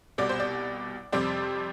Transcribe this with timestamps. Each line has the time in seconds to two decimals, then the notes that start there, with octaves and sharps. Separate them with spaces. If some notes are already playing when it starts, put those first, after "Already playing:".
0.18 C2 B2 G3 D5
0.29 C5
0.40 D5
1.12 F2 C3 G3 C4 D5